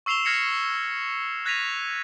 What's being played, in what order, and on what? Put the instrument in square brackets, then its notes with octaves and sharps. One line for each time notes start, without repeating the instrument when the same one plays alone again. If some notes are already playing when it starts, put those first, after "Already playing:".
[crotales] C#6 E6 C7 E7 F7 G7
F6 G#6 A#6 C7 C#7
F#6 G#6 A#6 B6 D#7 F7